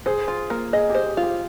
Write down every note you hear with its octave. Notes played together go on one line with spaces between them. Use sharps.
G#4 C5
F4
A#3
G#4 D#5
G4
C5
G4
F4
G4